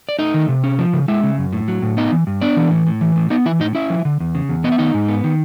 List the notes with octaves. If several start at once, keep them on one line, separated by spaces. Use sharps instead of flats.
D5
A3 D#4 D#5
D#3
C3
C#4
F3
C#3
G#3 E4 E5
C#3
F#2
A2
F#3
A2
B3 D#4 D#5
E3
G2
B3 D4 D5
E3
A2
A2
E3
A2
B3 D#4 D#5
E3 E4 E5
A2 D#4 D#5
C#4 E4 E5
F3
D3
E2
C#3
E2
B3 D#5
E5
D#3 D#4 D#5
G#2
B3
D#3